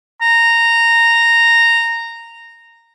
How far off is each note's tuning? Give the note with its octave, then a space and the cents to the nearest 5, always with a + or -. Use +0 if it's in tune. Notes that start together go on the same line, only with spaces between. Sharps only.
A#5 -10